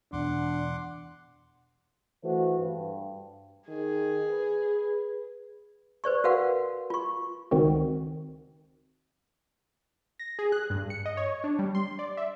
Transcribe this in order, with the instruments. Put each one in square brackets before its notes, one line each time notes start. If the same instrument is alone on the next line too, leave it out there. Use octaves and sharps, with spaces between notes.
[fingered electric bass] E2 B2 [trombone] D4 [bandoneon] F#5 C6 D6
[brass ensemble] E3 A3 F#4 C5
G2
[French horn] D#3 [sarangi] G#4
[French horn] B4
[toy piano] B4 C5 D5 C#6
F#4 A#4 B4 F5 F#5
F4 C#6
[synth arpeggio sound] C#2 D#3 C4 F#4
[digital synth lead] A#6
G#4
F#6
G2
C#7
D#5
C#5
D4
G3
C6
D5
E5